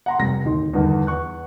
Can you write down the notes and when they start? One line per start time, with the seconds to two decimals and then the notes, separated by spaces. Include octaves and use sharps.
0.06 F#5 A#5 C6
0.19 F1 C2 A#6
0.44 D1 D#2 D#3 D#4 C6
0.73 E2 G2 D3 D#3
1.07 E2 C#6 F#6